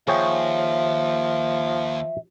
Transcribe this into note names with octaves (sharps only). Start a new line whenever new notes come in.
D#2 F3 G#4 C#5 E5 G5